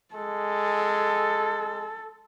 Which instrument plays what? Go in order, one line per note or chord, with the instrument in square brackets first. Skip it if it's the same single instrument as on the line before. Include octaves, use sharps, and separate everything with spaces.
[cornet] G#3 [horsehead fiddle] A4